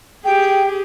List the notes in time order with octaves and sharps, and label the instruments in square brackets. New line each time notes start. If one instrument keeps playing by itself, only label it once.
[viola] G4 G#4 [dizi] G5